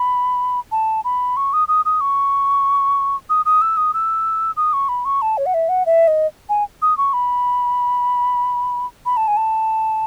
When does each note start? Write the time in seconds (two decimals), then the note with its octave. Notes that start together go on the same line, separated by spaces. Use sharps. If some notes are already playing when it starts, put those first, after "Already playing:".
Already playing: B5
0.72 A5
1.05 B5
1.37 C#6
1.53 D#6
1.68 D#6
1.85 D#6
2.01 C#6
3.30 D#6
3.45 D#6
3.62 E6
3.77 D#6
3.94 E6
4.57 D#6
4.73 C#6
4.89 B5
5.05 C#6
5.22 A5
5.38 C#5
5.46 F#5
5.54 E5
5.69 F#5
5.86 E5
6.08 D#5
6.49 G#5
6.82 D#6
6.98 C#6
7.13 B5
9.06 B5
9.17 A5
9.28 G#5
9.37 A5